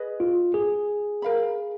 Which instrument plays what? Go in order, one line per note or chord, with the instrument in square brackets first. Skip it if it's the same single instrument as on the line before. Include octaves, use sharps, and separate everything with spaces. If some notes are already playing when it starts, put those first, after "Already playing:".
Already playing: [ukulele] G#4 B4 D#5
[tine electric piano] F4
G#4
[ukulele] A#4 F5 B5